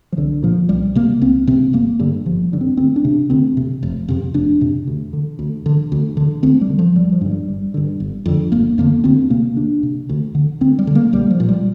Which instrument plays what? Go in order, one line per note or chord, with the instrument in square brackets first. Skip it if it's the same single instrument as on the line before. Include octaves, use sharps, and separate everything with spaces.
[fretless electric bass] F3
C2 D3
A#2 F3
C2 G3
C3 A#3
C2 C4
C3 C4
G1 A#3
G2 D3
G1 F3
G2 D3
C4
D2 C4
D4
C3
D2 C4
C3
F1
F2 C3
F1 D4
F2 C3
D2
D3
D2
D3
D2
D3
D2 C4
G3
D3
F3
G1 G3
F3
G2 D3
G3
G1 G3
G2 D3
G1
F2 D3
G1 A#3
F2 D3 A#3
D2 C4
C3 A#3
D2 D4
C3
D2
D3
D2 C4
G3
D3
A#3
A#1 G3
F3
A#2
G3